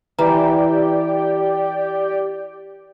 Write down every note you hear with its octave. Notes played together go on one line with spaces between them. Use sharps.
E3 G4 B4 D5 G5 A#5